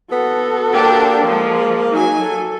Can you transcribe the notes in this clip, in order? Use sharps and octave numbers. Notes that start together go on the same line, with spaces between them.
B3 F#4 A4
A#3 D4 G4 C5
F3 G#3
F#3 D#4 G#5
A4